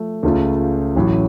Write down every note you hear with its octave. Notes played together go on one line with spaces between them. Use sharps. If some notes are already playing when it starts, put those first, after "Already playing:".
Already playing: F3 A3
C#2 C#3 A3 C#4 F4
A1 A2 F#3